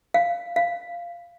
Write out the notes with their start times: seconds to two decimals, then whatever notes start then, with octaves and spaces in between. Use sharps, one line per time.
0.14 F5
0.56 F5